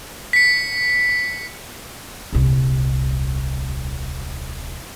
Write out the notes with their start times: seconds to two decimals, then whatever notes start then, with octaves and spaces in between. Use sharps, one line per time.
0.33 B6 C#7
2.33 D#1 C2